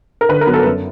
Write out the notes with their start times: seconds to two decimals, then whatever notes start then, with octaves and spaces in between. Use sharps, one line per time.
0.21 A#4
0.29 D3 B4
0.41 A#4
0.47 F#3 B3
0.54 A4
0.66 F#2